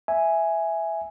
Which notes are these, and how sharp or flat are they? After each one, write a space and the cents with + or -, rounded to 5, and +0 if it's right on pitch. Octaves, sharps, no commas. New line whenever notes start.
E5 +0 G#5 +0